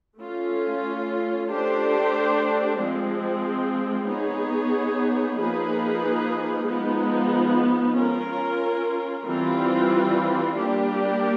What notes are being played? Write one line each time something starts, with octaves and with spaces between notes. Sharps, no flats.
A3 C#4 F4
A3 D4 G4 C5
F3 G#3 C4
B3 D#4 G#4 C#5
F3 A#3 D#4 G#4 B4
F3 G#3 B3 D#4
C#4 F4 A#4
E3 G3 C4 F4
G3 A#3 D4 G4